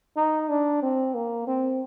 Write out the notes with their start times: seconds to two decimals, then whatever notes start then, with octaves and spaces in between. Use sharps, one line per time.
0.17 D#4
0.49 D4
0.82 C4
1.15 A#3
1.47 C4